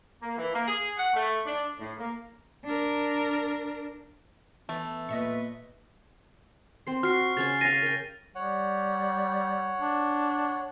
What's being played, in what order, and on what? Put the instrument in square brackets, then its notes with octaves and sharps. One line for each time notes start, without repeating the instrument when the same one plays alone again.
[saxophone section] A#3
E3
A#3
G#4
F#5
A3
D4
A2
A#3
[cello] D4 A#4
[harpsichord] E3 [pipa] A3 [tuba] B3
[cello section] A#2 B4 [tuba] B3 [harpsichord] D#5 E5 C#6
[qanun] C4 C6
[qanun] F#4 [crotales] F6 C7
[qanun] C#3 C#4 C#6 [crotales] A6
[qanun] F5 G#5 [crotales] A6 A#6 D#7
[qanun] A#4 G5
[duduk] G3 [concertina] C#5 F#5
[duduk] D4